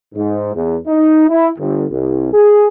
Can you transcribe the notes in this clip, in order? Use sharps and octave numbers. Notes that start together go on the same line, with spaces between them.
G#2
E2
D#4
E4
G1
C2
G#4